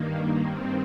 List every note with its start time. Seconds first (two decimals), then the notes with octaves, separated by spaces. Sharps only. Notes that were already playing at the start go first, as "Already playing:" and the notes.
Already playing: G2 D#3 A#3
0.42 C4